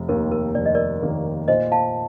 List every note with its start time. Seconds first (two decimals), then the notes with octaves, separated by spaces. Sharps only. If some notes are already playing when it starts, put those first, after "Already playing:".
Already playing: F1
0.08 D#2 D#3 A#3 A#4
0.32 A#4
0.55 F1 D5
0.66 D#5
0.75 A#4 D5
1.02 D#2 D#3 A#3
1.48 A#2 C5 D#5
1.72 F5 A5